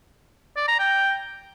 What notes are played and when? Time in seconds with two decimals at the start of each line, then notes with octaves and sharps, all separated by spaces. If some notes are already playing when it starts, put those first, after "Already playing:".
0.56 D5
0.68 A#5
0.79 G5